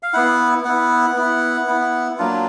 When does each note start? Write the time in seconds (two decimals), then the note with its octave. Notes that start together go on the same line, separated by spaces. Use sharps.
0.03 F5
0.13 B3 E4 F#5
0.65 B3 E4 F#5
1.16 B3 E4
1.67 B3 E4
2.18 F#3 A#3 D4 F4